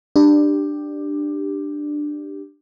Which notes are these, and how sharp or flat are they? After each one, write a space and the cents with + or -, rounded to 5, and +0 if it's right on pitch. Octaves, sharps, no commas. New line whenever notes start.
D4 +15 G4 +5